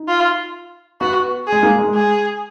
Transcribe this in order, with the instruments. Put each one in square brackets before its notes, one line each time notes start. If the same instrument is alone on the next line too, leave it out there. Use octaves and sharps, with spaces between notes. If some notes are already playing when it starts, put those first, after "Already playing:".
Already playing: [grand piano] D#4
[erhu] F4
[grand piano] B3 [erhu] F#4
[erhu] G#4
[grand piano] G#3
A#3
G#3
[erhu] G#4